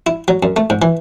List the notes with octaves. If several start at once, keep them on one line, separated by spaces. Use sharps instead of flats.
E4
F#3
F#2
A3
G#2
E3